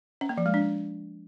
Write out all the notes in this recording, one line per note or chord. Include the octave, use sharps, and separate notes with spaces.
C#4
A#3
F3
G#3
D4